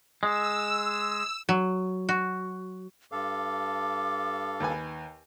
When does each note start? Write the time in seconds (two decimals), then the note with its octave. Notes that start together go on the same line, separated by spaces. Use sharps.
0.23 G#3 E6
1.49 F#3
2.09 F#4
3.12 G2 A4 F5 D6
4.60 D#2 B4 G#5